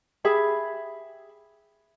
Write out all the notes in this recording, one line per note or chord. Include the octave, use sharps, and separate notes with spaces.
G4 G#4 E5 B5